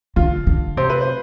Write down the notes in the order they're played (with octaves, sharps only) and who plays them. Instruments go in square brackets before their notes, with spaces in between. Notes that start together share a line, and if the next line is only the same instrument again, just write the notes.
[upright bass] D3 [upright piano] F4
[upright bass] D3
[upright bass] C3 [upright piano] C5
[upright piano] B4
C5